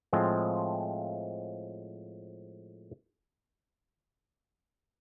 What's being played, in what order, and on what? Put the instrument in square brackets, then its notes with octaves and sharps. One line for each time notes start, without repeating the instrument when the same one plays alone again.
[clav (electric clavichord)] A2 F3 G#3 C4